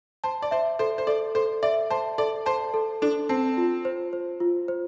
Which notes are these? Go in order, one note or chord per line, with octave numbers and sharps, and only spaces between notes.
C5 A5
D5
C5 E5
A4 C5
C5
A4 D5
A4 C5
D5 E5
C5 A5
A4 D5
C5 A5
A4
D4 A4
C4 A5
F4
C5
C5
F4
C5